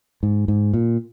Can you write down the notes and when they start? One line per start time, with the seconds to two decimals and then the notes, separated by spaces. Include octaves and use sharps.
0.23 G#2
0.48 G#2
0.74 A#2